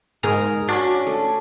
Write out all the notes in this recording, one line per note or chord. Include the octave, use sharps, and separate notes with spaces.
G#2 G#4 A#4 A#5
C#4 D4 F#4
A3